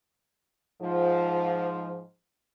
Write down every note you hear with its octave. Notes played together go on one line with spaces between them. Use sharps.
G#2 F3